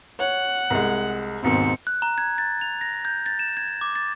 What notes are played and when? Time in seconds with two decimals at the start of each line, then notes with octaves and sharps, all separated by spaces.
0.20 C#5 F#5
0.70 C2 G#3
1.43 D#2 G#2 B2 C4 C#7
1.87 F#6
2.02 A#5
2.18 G#6
2.38 A6
2.61 F7
2.81 A#6
3.05 G6
3.26 A6
3.39 E7
3.57 G#6
3.81 D6
3.96 A6